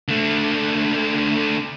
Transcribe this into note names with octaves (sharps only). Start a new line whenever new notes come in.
D3 A3